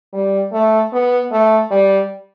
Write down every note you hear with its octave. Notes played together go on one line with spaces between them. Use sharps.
G3
A3
B3
A3
G3